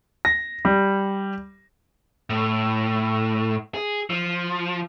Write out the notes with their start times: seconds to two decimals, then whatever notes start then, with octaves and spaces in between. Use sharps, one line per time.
0.25 A#6
0.65 G3
2.30 A2
3.74 G#4
4.10 F3